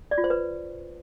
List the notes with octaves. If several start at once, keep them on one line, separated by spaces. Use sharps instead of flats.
D5
F4
C5
B4